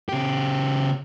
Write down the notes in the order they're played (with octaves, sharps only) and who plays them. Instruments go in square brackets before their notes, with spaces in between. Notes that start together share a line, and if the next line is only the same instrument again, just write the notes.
[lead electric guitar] C#3 G4